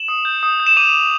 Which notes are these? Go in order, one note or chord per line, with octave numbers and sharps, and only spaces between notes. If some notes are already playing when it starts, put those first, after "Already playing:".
Already playing: E7 F#7
D#6
G6
D#6
G6
E7
D6 D#7 F7
D6